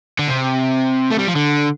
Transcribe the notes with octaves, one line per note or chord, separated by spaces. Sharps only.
D3
C3
A3
G3
F3
D3